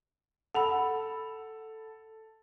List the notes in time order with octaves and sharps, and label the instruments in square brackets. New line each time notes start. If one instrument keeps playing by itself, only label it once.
[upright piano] A4 F7 [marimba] F#5 B5 E6